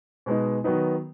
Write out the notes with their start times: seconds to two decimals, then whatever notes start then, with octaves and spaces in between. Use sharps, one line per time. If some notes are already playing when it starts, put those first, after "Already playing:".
0.26 B2 G#3 B3 D#4
0.64 D#3 F#3 B3 D#4